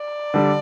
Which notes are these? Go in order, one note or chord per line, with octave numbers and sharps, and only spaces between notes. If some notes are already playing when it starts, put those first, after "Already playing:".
Already playing: D5
D3 G3